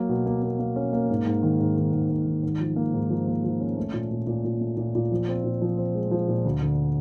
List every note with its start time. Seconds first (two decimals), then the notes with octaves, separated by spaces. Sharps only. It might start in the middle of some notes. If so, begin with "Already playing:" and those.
Already playing: F#3 A#3
0.09 B2
0.26 A#3
0.42 A#3
0.59 A#3
0.76 C#4
0.93 A#3
1.10 G#2
1.26 G#2
1.43 D#3
1.60 G#2
1.77 D#3
1.93 G#2
2.10 G#2
2.27 D#3
2.43 G#2
2.60 F3
2.76 A#3
2.94 G#2
3.10 F3
3.27 A#3
3.44 F3
3.60 C#4
3.77 A3
3.93 A#2
4.11 A#2
4.27 A#2
4.44 A#2
4.61 A3
4.77 A#2
4.95 A#2
5.12 F3
5.28 C4
5.44 A#2
5.62 F3
5.77 C4
5.95 G#3
6.11 F3
6.28 A#2
6.45 D2
6.62 D3